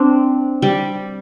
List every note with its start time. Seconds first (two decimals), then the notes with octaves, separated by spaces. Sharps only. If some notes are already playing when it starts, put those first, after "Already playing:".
Already playing: C4 D4
0.62 G3